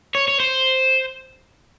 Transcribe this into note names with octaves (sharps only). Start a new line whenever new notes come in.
C#5
C#5
C5